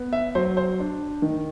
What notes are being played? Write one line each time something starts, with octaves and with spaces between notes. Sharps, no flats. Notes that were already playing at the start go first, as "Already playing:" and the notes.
Already playing: B3
E5
F#3 C5
C5
D4
D#3